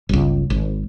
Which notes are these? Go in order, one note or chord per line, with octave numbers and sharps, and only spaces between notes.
G1 C#2
G#1